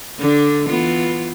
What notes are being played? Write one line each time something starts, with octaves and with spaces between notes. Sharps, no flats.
D3 D4
E3 B3 F4